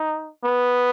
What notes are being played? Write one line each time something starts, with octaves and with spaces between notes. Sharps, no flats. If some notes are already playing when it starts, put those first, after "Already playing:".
Already playing: D#4
B3